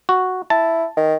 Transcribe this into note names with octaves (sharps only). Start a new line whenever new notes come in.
F#4
E4 A5
D#3